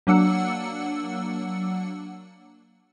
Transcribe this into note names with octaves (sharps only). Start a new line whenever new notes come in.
F#3 A#3 D4 F#5 E6 C#7